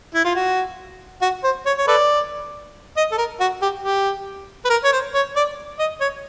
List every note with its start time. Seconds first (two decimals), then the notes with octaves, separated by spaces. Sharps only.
0.14 E4
0.24 F4
0.35 F#4
1.22 F#4
1.44 C5
1.66 C#5
1.77 C#5
1.87 A4 B4 D5
2.97 D#5
3.12 A4
3.18 A#4
3.40 F#4
3.62 G4
3.83 G4
4.65 B4
4.70 A#4
4.84 C#5
4.92 C5
5.14 C#5
5.36 D5
5.79 D#5
6.01 C#5